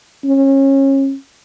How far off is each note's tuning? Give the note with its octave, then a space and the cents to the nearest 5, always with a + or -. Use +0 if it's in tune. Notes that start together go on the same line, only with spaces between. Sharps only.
C#4 -30